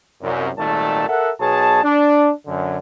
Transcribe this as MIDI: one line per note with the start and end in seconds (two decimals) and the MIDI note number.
0.21 0.49 36
0.21 0.49 42
0.57 1.04 32
0.57 1.04 46
0.57 1.04 51
0.57 1.04 55
0.57 1.04 57
0.57 1.04 81
1.08 1.30 69
1.08 1.30 70
1.08 1.30 76
1.08 1.30 78
1.39 1.81 35
1.39 1.81 47
1.39 1.81 68
1.39 1.81 73
1.39 1.81 81
1.83 2.30 62
2.46 2.77 42
2.46 2.77 50